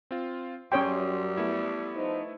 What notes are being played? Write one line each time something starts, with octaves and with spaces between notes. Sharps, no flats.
C4 F4
F#2 F#3 G3 C#4 C#5 G5 C6 D#6
A3 B3 E4
F3 D#4 C5